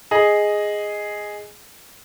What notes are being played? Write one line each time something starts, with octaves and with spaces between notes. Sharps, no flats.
G#4 D#5